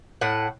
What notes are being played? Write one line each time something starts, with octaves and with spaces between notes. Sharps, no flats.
A2 F#5